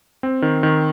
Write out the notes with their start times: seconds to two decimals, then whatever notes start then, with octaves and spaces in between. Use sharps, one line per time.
0.23 C4
0.42 D#3
0.63 D#3